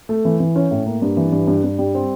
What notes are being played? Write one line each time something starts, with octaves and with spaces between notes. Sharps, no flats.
A3
E3
E3
C#4
A2
A#3
G2
E3
G2
G2
G2
G3
C4